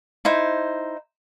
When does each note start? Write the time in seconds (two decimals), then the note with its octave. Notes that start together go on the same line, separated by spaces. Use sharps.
0.25 D#4 E4 C5